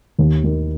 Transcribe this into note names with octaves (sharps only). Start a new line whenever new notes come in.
D#2
D#3